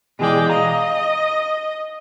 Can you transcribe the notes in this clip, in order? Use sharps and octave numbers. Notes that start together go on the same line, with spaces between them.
B2 E3 G#3 D5 G5
D#5 F5 A#5